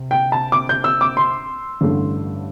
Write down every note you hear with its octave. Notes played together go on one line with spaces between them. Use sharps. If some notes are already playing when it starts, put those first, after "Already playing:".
Already playing: C3
G5
A5
D6
G6
E6
D6
C6
A1 G2 D3 A3